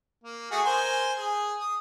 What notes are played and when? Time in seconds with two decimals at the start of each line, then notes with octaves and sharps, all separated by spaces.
0.24 A#3
0.51 A3 F#4 G#4
0.65 A#4 C5 G#5
1.18 G#4
1.60 D#6